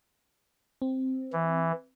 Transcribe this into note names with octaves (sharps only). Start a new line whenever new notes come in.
C4
E3